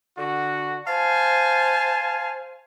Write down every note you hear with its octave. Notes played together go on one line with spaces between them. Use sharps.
D3 F#4
C5 F5 G#5 A5